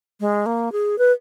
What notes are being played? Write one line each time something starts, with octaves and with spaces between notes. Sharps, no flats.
G#3
A#3
G#4
B4